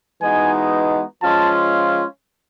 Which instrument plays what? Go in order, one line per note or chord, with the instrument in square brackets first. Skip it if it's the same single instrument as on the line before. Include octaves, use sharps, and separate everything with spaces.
[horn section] E3 G#3 B3 D#4 F#4 [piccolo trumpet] G#5
[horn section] F3 G#3 C#4 F4 [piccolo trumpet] A5